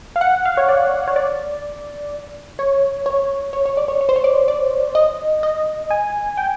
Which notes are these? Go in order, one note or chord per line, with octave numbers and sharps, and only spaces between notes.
F5
F#5
F5
C#5
D5
C#5
D5
C#5
C#5
C#5
C#5
D5
C#5
C#5
C5
C#5
D5
D5
D#5
D#5
G#5
G5